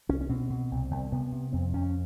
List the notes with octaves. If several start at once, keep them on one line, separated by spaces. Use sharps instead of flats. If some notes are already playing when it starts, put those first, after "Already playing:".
C2 C#4
C#4
B2 C4
B2
C2
C2
C3 B3
C3
F2 C4
F2 C#4